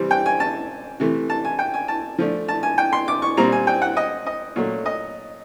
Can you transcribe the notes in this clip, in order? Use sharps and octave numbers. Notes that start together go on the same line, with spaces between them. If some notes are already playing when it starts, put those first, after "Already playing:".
Already playing: C3 E3 G3 C4
G5
G#5
A5
C3 E3 A3
A5
G#5
G5
G#5
A5
F3 A3 D4
A5
G#5
G5
C6
D6
C#6
A#2 G3 C4 A#5
G#5
G5
F#5
D#5
D#5
A#2 F#3 A3
D#5